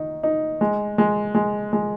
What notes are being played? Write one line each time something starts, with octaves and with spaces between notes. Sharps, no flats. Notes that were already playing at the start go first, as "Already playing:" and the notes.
Already playing: D#3 D#4
D#4
G#3
G#3
G#3
G#3